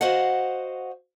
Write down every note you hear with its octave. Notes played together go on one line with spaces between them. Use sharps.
F#4 C5 D#5 F5 F#5